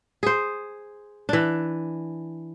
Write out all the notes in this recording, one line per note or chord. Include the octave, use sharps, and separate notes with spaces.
G#4 C5
E3 D4